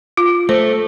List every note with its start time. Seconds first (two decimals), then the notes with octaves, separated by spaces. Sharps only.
0.17 F4
0.49 A3 C5